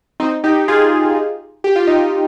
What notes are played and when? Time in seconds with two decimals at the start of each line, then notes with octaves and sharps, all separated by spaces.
0.20 C4 D#4
0.44 D#4 G4
0.68 F4 G#4
1.64 G4
1.76 F4
1.87 D#4 G4